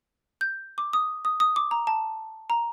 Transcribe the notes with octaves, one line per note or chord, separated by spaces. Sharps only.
G6
D6
D#6
D#6
D#6
D6
A#5
A5
A#5